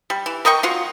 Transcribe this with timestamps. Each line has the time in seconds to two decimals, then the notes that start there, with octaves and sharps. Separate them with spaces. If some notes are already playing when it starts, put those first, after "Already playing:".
0.10 G3
0.26 E3
0.45 A#4 D#5 G5 C#6
0.63 F#3 F4 F#4